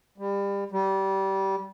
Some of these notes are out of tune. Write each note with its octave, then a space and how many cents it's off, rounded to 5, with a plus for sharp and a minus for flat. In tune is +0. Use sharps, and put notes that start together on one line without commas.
G3 +30
G3 -20